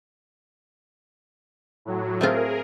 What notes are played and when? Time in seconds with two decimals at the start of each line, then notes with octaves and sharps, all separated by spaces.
1.85 A2 F#3
2.21 A3 C4 F4 G#4 A#4